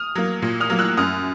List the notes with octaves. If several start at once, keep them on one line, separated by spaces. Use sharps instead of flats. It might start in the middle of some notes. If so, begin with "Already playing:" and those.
Already playing: D#6 F6
F#3 A#3
A#2
D#6 F6
F#3 A#3
E6 F#6
F#2 D#6 F6